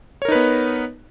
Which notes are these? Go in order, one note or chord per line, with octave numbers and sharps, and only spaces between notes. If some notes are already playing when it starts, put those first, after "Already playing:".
B3 D#4 A#4 B4 C#5